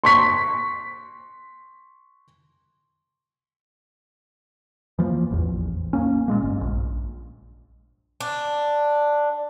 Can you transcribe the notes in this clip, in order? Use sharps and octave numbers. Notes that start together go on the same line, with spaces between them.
C6 C#6 B6
E3 F3 A#3
A1 E2
A#3 C#4
A#2 G#3 A#3
G1
A#1
D4